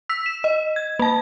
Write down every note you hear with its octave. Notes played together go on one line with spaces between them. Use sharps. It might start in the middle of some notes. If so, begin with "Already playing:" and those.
E6 B6
E7
D#5
G#6
A#3 A5